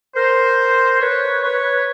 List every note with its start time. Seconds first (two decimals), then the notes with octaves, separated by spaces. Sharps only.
0.15 A#4 C5
1.01 B4 C#5
1.44 B4 C#5